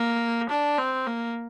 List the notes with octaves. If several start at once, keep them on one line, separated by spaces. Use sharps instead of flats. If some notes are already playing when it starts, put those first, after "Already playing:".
Already playing: A#3
D4
C4
A#3